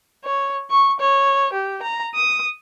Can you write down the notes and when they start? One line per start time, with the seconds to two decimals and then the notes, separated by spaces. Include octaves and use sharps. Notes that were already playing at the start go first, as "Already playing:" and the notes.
0.24 C#5
0.70 C#6
1.00 C#5
1.53 G4
1.82 A#5
2.15 D#6